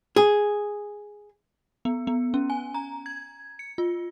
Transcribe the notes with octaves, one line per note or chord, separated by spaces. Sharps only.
G#4
B3
B3
C#4
G#5
A#5
G#6
C#7
F4